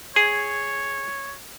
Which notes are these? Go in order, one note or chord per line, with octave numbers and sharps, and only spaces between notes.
G#4 C#5